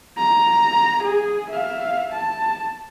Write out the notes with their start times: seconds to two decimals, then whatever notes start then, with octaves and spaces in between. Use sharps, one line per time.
0.17 A#5
1.03 G#4
1.51 E5 F5
2.13 A5